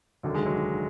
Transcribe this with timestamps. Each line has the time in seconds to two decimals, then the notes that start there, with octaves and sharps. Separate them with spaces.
0.23 F1 D#2 D3 F#3
0.34 G#3
0.46 F#3